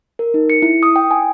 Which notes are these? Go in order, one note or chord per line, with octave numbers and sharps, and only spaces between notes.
A#4
D#4
C#7
E4
D#6
G5
G#5